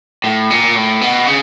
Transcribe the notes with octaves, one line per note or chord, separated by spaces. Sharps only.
A2
A#2
A2
B2
C#3